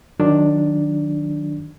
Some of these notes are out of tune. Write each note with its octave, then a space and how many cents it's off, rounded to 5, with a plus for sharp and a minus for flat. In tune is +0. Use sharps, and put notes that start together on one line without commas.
D#3 -15 F#3 -20 D4 +0